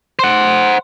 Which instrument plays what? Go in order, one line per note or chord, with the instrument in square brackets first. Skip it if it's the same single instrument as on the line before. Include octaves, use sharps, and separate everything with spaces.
[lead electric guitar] C5 F#5